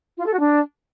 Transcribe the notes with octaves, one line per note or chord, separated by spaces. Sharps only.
F4
A4
F#4
D4